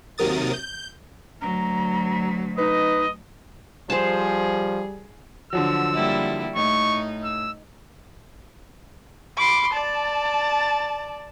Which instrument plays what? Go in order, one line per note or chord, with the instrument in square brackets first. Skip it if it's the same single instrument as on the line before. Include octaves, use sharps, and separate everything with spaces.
[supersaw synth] D#2 C3 F#3 A#4 D#6 A6
G6
[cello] D2 F#3 [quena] A#5
[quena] D#4 [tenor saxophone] B4 [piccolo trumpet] D#5
[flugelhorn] F3 [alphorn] G3 [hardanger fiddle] G#4 [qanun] C5 A5
[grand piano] D3 F3 F#3 [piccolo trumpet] E6
[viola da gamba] G3 A#3 E4
[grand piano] A2 [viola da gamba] D#4 [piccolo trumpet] C#6
[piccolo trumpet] E6
[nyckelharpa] B5 C6 [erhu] D6
[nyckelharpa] D5 [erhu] A5